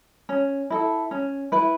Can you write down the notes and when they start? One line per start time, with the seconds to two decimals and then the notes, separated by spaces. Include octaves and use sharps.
0.29 C#4
0.70 E4 A4
1.11 C#4
1.52 E4 B4